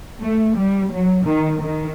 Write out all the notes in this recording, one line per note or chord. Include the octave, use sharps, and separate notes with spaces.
A3
G3
F#3
D#3
D#3